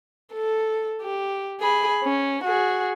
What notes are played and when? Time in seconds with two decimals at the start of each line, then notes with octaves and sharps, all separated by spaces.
0.33 A4
1.02 G4
1.61 G#4 B5
2.04 C#4
2.44 F#4 G#4